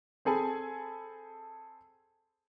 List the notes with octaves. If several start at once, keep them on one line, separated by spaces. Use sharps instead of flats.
C4 G#4 A4 G#5 B5